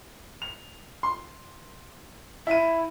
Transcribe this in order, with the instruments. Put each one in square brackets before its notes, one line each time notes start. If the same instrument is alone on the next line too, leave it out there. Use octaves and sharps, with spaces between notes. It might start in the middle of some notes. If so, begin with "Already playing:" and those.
[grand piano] F7
C6
[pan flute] E4 [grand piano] E5 D#7